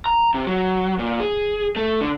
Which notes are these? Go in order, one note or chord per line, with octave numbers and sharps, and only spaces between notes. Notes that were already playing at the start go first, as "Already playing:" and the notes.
A#5
C3
F#3
A#2
G#4
A3
D3